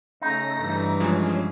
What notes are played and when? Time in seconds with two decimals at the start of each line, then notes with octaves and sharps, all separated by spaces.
0.22 C#3 A3 D#4 A#6
0.61 G2 E3
1.00 F3 G#3 C#4 G#4